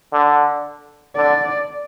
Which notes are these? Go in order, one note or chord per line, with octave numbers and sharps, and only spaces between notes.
D3
D3 D5